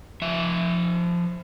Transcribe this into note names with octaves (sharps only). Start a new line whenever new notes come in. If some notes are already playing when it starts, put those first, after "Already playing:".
F3 E5